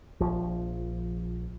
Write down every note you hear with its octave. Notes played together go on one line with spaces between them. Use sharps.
A#1 F3